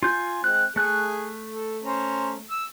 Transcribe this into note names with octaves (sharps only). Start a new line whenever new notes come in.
F4 G#5 G6
G#3 C4 F#6
A3 G#4 F#6
A4
C#4 C5 A#5
E6